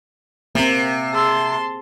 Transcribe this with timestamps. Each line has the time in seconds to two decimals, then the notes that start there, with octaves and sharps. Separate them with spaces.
0.55 C3 A#3 C4
1.13 G#4 A5 C6 E6